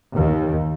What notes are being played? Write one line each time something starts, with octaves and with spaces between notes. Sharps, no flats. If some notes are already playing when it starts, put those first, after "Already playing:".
D#2